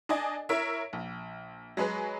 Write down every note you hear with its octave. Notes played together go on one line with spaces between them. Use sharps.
D4 D5 D#5 G#5
E4 A#4 C#5 E5
A#1
F#3 G#3 G#4 B4